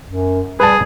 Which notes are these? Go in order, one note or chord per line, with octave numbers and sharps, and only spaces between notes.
F#2
G3 G#4 B4 A5